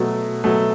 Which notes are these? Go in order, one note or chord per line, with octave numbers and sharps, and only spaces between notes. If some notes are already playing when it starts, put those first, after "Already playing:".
Already playing: B2 F#3 A3
B2 F#3 A3